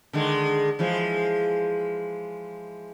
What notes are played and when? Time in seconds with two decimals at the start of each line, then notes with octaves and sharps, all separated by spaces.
0.13 D3 D#3 G#3
0.79 E3 F3 G#3